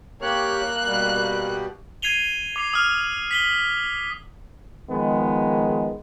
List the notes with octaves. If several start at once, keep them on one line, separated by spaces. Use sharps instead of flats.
A#3 G4 C#5 F#6
B2 G3
G#6 C7 D#7 F7 G7
D6 C7
D#6 F6
B6 F#7 G7
D#3 F3 G#3 B3